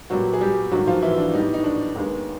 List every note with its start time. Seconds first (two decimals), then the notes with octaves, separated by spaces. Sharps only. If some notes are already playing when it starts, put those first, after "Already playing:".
0.10 A#2 F#3 G3 B3 F#4
0.33 G#4
0.41 G3 G4
0.72 G#2 D#3 F#3 G3 A#3 F#4
0.87 F3 F4
1.02 E3 E4
1.18 D4
1.34 A2 E3 G3 B3 D#4
1.54 D#4
1.64 D4
1.95 D#2 D#3 G#3 B3